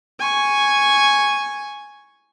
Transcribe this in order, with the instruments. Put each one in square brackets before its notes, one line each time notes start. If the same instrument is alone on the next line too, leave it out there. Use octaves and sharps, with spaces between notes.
[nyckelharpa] G#5 C#6